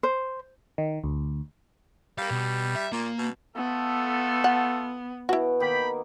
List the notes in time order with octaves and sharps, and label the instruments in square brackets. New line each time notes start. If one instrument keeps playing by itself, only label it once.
[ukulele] C5
[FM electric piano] D#3
D2
[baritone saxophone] G3 [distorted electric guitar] A#4 F5
[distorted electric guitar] B2
E5
[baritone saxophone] A#2 [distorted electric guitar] A#3
[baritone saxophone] B2
[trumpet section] A3 F4 A4 [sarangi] B3
[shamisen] F#5
[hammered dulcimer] B2 [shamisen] E4 F#4
[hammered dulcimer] D#3 A#3 B3 [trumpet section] G5 B5